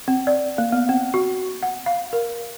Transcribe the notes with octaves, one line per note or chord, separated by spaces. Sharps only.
C4
D5
A#3
B3
C4
F#4
F#5
F5
A#4